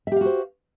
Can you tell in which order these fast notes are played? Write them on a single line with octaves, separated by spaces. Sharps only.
E5 G4 F5 F#4 C5